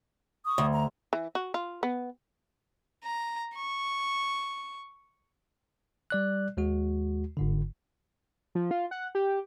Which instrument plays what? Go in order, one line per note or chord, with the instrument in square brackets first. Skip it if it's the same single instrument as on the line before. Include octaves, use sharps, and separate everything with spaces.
[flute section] C#6 D#6
[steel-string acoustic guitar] D2
[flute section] A#5
[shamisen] E3
F#4
F4
B3
[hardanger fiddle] A#5
C#6
[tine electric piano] G3 D5 F#6
D#2 G#3 F#4
G1 G#2 D3
[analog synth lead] F3
F4
F#5
G4